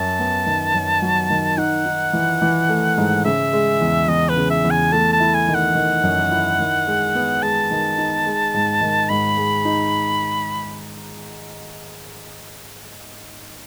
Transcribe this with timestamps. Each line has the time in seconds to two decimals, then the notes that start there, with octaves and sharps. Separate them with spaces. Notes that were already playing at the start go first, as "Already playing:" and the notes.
Already playing: F#2 A5
0.19 B3
0.46 D#3
0.74 F#2
1.02 F#3
1.30 D#3
1.57 D#4 F#5
1.86 D#4
2.13 E3
2.42 E3
2.69 A3
2.98 G#2
3.25 C#3 E5
3.53 G#3
3.81 E2
4.08 E2 D#5
4.29 B4
4.37 C#3
4.51 E5
4.64 E2
4.71 G#5
4.92 A3 A5
5.13 A5
5.20 E4
5.34 G#5
5.48 D#3
5.55 F#5
5.75 D#3
6.03 F#2
6.31 E4
6.60 D#3
6.87 G#3
7.15 B3
7.43 G#3 A5
7.71 D#3
7.98 D#4
8.26 G#3
8.54 G#2
8.81 D#3
9.09 G#2 B5
9.37 G#3
9.65 D#4